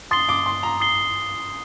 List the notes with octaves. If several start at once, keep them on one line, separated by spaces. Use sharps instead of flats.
C6 D#6 A6 C7 G7
D6
C6
A#5
D#6 A6 C7 G7